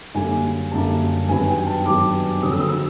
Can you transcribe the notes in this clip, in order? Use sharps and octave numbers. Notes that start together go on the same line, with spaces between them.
F#2 D3 G3 A#3 G#5
F#2 D3 G3 A#3 A5
G2 D#3 F#3 B3 G#5
G5
A5
G2 D#3 F#3 B3 D6
F2 D3 F#3 D#6
E6
D#6
E6